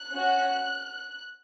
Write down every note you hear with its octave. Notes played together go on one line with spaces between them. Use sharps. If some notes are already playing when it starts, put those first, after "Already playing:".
Already playing: F#6
C#4 F#4